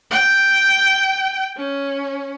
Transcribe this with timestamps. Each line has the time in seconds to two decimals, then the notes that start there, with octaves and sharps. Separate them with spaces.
0.10 G5
1.56 C#4